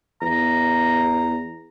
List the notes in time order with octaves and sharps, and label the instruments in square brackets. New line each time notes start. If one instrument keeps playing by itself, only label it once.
[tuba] E2 [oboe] A#5